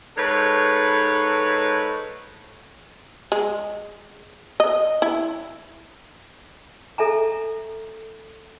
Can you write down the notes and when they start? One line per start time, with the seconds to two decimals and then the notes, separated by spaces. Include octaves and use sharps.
0.17 G#2 A4 B4 C#5
3.32 G#3
4.60 D#5
5.02 E4
6.98 A4 E5 G#5 A#5